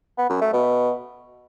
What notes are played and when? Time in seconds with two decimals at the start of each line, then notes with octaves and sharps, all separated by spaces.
0.18 B3
0.29 F#2
0.41 A3
0.53 B2